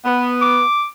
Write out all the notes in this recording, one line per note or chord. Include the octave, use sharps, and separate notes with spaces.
B3
D6